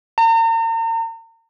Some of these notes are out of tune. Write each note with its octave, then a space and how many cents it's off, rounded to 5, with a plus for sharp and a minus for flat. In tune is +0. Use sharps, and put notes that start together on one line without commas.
A#5 -40